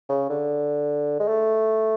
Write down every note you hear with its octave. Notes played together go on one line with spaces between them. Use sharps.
C#3
D3
G#3
A3